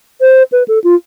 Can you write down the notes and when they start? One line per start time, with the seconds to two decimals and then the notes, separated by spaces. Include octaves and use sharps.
0.21 C5
0.52 B4
0.68 A4
0.84 F4